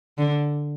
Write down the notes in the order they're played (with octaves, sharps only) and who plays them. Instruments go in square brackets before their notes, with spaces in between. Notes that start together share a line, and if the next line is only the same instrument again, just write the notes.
[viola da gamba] D3